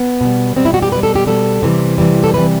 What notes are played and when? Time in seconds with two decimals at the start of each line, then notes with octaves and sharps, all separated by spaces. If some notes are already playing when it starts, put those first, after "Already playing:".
Already playing: B3
0.21 B2 G3
0.56 B2 G3 C4
0.65 E4
0.74 F#4
0.82 G4
0.91 B2 G3 B4
1.03 A4
1.15 G4
1.27 B2 G3 A4
1.63 C3 E3 G3
1.98 C3 E3 G3
2.24 A4
2.34 C3 E3 G3 B4